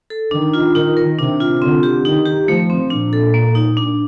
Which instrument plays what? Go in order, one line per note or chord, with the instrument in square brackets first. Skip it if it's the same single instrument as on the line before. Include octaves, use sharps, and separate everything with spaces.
[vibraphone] A4
[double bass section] D#3 [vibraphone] D4
[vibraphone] F4
[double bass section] D#3 [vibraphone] D#4
[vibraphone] A#4
[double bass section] C3 [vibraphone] D4
[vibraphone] F4
[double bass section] D3 [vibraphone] C4
[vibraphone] G4
[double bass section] D#3 [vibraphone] D#4
[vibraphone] G4
[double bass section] F3 [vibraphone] A3
[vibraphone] C4
[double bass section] A#2 [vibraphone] D4
[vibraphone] A4
A#3
D#4
D4